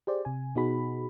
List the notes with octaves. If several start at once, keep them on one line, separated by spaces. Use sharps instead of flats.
G4 G#4 C5 D5
C3 G#5
B2 B3 D#4 F#4 G#4 B5